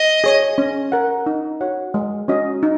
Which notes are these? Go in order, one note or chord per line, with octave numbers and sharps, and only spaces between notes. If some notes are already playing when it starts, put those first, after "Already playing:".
Already playing: D#5
G#4 C#5
C#4
A#4 F#5
D#4
F#4 C#5 F#5
G#3
C#4 F#4 D#5
D#4